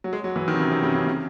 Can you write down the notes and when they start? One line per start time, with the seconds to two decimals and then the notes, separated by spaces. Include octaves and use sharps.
0.04 F#3
0.13 G#3
0.24 F#3
0.36 E3
0.48 D#3
0.54 C3
0.60 C#3
0.72 C3
0.83 C#3
0.95 C#3
1.06 C#3